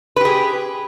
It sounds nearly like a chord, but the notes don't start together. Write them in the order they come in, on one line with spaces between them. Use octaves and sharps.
B4 G4 G#4